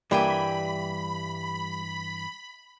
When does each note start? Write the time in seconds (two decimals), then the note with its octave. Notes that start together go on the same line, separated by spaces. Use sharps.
0.11 G2 E3 G3 A#3 E5 G5 G#5 B5